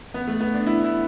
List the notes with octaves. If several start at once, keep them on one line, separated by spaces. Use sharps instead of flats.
B3
A3
B3
D4
E4
E4